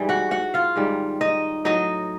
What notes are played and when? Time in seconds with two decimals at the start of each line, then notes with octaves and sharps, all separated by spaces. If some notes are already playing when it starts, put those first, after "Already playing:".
Already playing: G#2 E3 G3
0.09 F#4 F#5
0.31 F#4 F#5
0.54 F4 F5
0.76 G#2 D#3 G3
1.21 D#4 D#5
1.65 A2 F#3 D#4 D#5